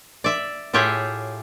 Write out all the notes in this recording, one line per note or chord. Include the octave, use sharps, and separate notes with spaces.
D5 E5
A2 F4 G4 G#4 C#5 E5